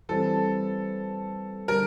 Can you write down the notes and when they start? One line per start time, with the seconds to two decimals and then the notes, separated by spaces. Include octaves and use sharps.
0.09 E3 G3 C4 A4
1.68 D3 G3 A#4